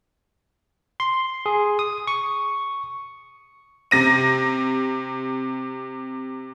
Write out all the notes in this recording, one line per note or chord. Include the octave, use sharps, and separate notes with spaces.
C6
G#4
D#6
C#6
C3 A#6 D#7